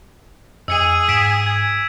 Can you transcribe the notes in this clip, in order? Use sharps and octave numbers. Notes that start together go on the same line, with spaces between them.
F2 G#4 E6 C#7 D#7
G#2 B6 D7 E7
G#6